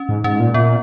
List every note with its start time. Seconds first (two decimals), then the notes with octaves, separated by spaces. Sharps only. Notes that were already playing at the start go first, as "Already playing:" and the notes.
Already playing: C#4
0.09 G#2
0.24 G#2 C#4
0.40 A#2
0.54 A#2 B3